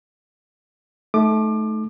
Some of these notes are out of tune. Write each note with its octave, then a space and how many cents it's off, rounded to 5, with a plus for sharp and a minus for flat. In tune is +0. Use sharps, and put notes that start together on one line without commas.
A3 -20 D#4 +10 D6 +30